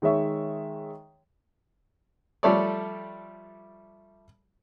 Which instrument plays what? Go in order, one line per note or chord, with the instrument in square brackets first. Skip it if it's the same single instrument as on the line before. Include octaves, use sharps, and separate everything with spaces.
[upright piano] D#3 G#3 C#5 E5 C#6
[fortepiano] F3 G3 A3 A4 C#5 D5